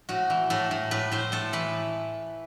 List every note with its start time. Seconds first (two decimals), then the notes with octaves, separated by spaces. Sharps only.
0.09 A2 F#4
0.30 E3
0.50 A2 A4
0.71 A2
0.91 A2 B4
1.12 A2 C5
1.32 A2 A4
1.53 E3 B4